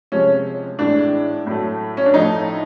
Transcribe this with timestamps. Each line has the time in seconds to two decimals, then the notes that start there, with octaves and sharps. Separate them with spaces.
0.12 C3 F3 G#3 C#4
0.79 A2 E3 G#3 D4
1.46 A2 F#3 A3
1.97 C#4
2.06 D4
2.13 A2 F3 A3 D#4